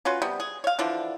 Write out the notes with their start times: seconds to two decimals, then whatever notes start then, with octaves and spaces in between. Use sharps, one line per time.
0.05 C#4 F4 F#4 B4
0.22 C3 G3 B3
0.40 G#4
0.64 C#5 F5
0.79 D3 E3 F3 D4